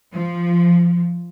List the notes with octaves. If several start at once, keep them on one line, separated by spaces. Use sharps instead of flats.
F3